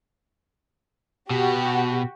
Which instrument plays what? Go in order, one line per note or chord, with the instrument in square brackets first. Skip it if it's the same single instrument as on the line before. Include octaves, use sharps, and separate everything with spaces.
[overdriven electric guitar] B2 [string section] F#4 G4